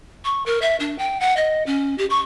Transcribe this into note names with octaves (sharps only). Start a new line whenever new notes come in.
C#6
A#4
E5
D4
G5
F#5
D#5
C#4
G4
C#6